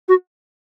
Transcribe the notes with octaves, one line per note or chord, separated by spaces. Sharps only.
F#4